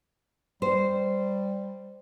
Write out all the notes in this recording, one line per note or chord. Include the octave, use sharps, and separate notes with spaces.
G3 C5